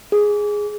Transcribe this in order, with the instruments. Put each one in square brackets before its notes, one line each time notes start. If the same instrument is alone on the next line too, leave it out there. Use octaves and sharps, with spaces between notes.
[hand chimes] G#4